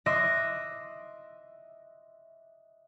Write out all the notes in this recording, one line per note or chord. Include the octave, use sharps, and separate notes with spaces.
D#5 E5 C6 D6 F#6 A#6